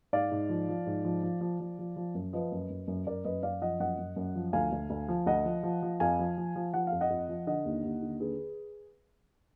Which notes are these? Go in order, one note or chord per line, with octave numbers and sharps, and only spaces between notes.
G#2 D5 F5
G#2
F3
F3
G#2
F3
F3
F3
F3
F3
F3
F#2
F3 B4 D#5
F#2
F#2
F#2
F#2 A#4 D5
F#2 B4 D#5
F#2 D5 F5
F3 D#5 F#5
F#2 D#5 F#5
F#2
F#2
F3
D2 F5 G#5
D2
D2
F3
D2 D#5 F#5
F3
F3
F3
F2 F5 G#5
F3
F3
F3
F3 F#5
F5
F2
D#5 F#5
F2
F3
D3 D#5 F#5
D#2
D#2
D3
D3 G#4 B4